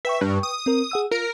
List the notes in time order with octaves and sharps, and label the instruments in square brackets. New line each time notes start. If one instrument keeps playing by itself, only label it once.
[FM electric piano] B4 G5 C#6 [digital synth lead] E5
[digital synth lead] G2
D#6
[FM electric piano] C4 A#4
G#4 F#5 E6
[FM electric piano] F4 [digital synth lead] A#4